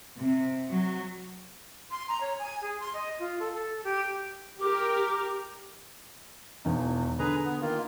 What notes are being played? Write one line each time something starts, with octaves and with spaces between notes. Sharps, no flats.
C3
F#3
C6
A#5
C#5
G#5
G#4
C6
D#5
F4
A4
A4
G4
G4 A#4 D6
E1 E2 D#4
D3 G#4 B4 A#5
B3
D#3 A#3 F4